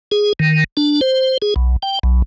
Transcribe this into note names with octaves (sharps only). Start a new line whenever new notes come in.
G#4
D#3
D4
C5
G#4
B1
G5
B1